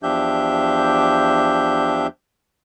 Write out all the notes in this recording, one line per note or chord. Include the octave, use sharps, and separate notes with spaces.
E2 F3 D4 G4 E5 G6